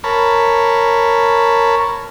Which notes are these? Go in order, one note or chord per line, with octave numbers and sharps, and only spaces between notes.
A#4 C#5 A5 B5